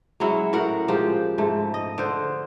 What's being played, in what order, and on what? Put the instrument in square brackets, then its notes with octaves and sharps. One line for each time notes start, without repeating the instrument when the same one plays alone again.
[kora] F#3 G#3 C#4 E4
A2 F#4 A#4 F#5
F3 G#3 G4
G#2 A3
D#5
D3 C5